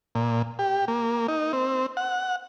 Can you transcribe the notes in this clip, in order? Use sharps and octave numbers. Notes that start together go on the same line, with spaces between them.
A#2
G4
A#3
D#4
C4
F#5